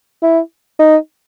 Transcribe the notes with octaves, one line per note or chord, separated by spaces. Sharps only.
E4
D#4